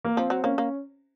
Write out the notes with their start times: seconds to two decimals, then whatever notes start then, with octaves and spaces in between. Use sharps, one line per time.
0.04 A#3
0.17 F3 C4
0.30 F#3
0.44 A#3 C#4
0.58 A#3